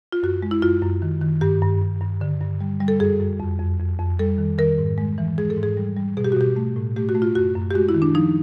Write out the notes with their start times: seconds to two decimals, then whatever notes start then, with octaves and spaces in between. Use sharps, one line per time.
0.12 F4
0.23 F#2 F#4
0.42 G#3
0.51 E4
0.62 F#2 F4
0.82 F#2
1.02 D#3
1.21 D#3
1.41 G2 G4
1.62 G2
1.81 G2
2.01 G2
2.21 D3
2.41 G2
2.61 G3
2.80 G3
2.88 A4
2.99 F#2 G#4
3.20 F#2
3.40 F2
3.60 F2
3.79 F2
3.99 F2
4.19 G3 A4
4.38 D#3
4.58 D#3 A#4
4.78 G#2
4.98 G#3
5.18 E3
5.38 G#3 G#4
5.50 A4
5.57 G#2
5.63 G#4
5.77 G3
5.97 G3
6.17 B2 G#4
6.24 G4
6.32 F#4
6.37 B2 G4
6.56 A3
6.76 A2
6.96 A3 G4
7.09 F#4
7.15 A3
7.22 F4
7.35 F#2 F#4
7.55 F#2
7.71 G4
7.74 G#3 F#4
7.89 E4
7.95 D#3
8.02 D4
8.14 F3 D#4